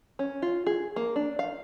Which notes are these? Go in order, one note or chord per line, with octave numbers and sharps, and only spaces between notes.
C#4
F4
G#4
A#3
D4
F5